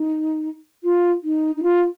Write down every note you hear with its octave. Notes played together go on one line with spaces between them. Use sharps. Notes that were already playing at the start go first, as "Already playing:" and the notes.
Already playing: D#4
F4
D#4
D#4
F4